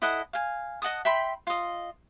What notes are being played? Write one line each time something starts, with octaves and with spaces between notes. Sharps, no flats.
E4 A4 D#5 F#5
F5 G#5
D#5 F#5 A5 D#6
E5 G5 B5 C6
F4 D#5